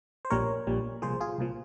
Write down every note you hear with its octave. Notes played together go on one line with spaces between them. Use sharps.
C5
A#1 A#2 G3 A#4 C#5
A#1 A#2 G3
C2 A#2 F3 G#4 C5
F4 G#4
C2 A#2 F3